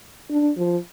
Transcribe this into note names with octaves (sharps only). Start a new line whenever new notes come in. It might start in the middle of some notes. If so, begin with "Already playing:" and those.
D4
F3